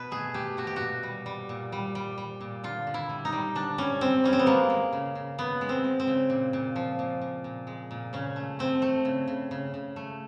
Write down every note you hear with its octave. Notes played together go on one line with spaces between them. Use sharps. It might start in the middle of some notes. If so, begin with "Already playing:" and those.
Already playing: B2 B4
A3 G#4
A3 G4
B2 F#4
G4
A#2 F#4
G3
G3
A#2
G3
G3
G3
A#2
D3 F4
D3
E4
G3
D#4
G3
D3 D4
G3 C#4
G3 C4
G3 C#4
C4
B3
G#3 A#3
G#3
C#3
C#3
C#3 B3
G#3
C4
G#3
C4
C#3
A#2
A#2
F3
A#2
A#2
A#2
G#3
A#2
C#3 C#4
A3
A3 C4
A3
C#3
C#3
C#3
C#3
A3